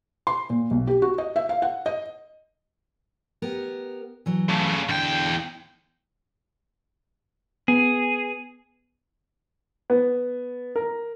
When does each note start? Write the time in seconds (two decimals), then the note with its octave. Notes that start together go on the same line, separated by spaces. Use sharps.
0.27 C6
0.50 A#2
0.71 B1
0.87 G4
1.02 F#4
1.18 D#5
1.36 E5
1.49 F5
1.62 F#5
1.86 D#5
3.42 B3 G4 A#4
4.26 E3 F#3
4.49 C#3 A3
4.89 E2 D3 G5
7.68 B3 G#4
9.90 B3
10.76 A#4